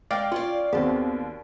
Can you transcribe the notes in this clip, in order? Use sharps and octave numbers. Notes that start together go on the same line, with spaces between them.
G#3 D5 F5 G5
C#4 F4 D5
D#2 B3 C4 F#4 G#4